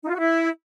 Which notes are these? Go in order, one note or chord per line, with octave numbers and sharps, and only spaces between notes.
D#4
F4
F#4
E4